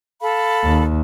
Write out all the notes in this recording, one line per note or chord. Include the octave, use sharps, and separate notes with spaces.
A4 F5 B5
D#2